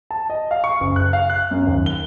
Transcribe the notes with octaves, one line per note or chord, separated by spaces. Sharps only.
A5
D#5
F5
C#6
F#1
F#6
F5
F#6
F#2
D#2
G7